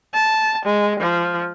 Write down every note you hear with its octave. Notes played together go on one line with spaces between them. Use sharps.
A5
G#3
F3